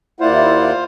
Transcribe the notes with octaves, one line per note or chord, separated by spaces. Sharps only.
D#2 A#3 E4 F4 C5 D5 F#5